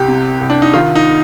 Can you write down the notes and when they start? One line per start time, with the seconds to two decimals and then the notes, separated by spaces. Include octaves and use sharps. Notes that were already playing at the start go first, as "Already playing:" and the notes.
Already playing: C2 G4
0.08 C3
0.41 C2
0.50 D4
0.62 D#4
0.74 D#3 F4
0.95 D#4